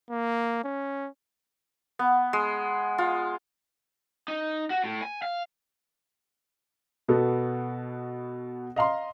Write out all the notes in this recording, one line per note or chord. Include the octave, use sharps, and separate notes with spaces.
A#3
C#4
B3
G#3
F4
D#4
F#4
A2
G#5
F5
B2 B3 F#4 A4
D#5 F5 A#5 C6